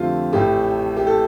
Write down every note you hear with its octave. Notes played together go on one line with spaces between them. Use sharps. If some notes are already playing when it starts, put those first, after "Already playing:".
Already playing: F2 D3 A3 C4 F4 G4
A1 A2 A3 G4
G4
A4